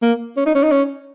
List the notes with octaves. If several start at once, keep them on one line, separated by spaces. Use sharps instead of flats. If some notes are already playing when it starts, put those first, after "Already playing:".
A#3
C#4
D#4
C#4
D#4
C#4